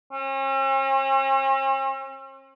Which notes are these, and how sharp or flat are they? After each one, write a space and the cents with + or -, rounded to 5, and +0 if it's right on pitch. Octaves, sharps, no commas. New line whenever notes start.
C#4 -45